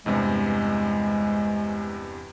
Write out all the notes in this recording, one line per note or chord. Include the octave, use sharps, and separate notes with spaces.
E2 G2 C3 G#3